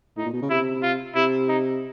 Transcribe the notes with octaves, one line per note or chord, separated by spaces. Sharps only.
A2 D#4
A#2
B2
C#3
C3 E4
F4
C3 E4
D#4